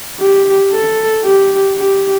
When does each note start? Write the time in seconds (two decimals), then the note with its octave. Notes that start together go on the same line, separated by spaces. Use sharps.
0.20 G4
0.72 A4
1.24 G4
1.76 G4